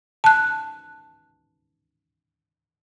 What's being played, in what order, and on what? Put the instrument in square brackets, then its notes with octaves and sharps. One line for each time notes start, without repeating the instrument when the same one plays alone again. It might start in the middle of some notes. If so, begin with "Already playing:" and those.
[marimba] A5 F#6